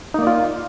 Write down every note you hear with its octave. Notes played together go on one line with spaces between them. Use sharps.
A#3 D#4 F4 D5